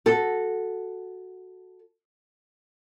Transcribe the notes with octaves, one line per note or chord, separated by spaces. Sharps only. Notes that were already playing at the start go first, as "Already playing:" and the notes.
F#4 A4